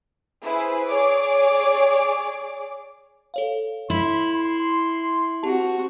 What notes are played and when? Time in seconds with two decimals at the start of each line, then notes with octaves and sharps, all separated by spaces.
0.42 E4 G#4 B4 C5
0.86 G#4 C#5 D5 D6
3.34 A4 C#5 F5
3.90 E4 B5 C6
4.34 C6
5.43 C4 F#4 G4 A5